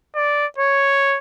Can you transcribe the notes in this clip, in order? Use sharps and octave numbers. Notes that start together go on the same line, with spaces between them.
D5
C#5